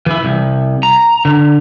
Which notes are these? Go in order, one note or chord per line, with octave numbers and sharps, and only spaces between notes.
E3 E4
C2
A#5
D3